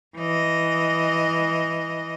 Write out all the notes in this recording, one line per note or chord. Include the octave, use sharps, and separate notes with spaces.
E3 D#5